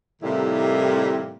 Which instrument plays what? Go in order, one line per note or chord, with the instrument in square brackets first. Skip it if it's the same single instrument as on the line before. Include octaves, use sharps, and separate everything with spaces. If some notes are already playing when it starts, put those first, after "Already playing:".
[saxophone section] A2 C3 D#3 G3 A#3 E4